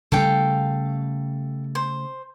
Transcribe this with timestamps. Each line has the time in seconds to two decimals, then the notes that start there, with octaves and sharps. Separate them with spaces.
0.12 C#3 G3 A3 A4 F5 G5
1.75 C5